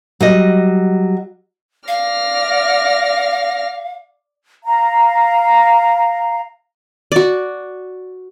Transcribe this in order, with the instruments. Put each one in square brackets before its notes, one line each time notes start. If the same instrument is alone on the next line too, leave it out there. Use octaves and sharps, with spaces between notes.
[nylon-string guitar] F#3 G3 D#5
[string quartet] D5 F6 A#6 [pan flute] F5
[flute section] F5 A#5
[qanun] F#4 D5